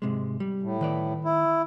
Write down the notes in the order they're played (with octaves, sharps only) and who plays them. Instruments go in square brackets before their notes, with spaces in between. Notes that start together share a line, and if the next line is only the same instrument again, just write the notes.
[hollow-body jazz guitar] G#2 C3 G#3
G3
[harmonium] A2
[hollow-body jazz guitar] D#3 B4 D5
[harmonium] E4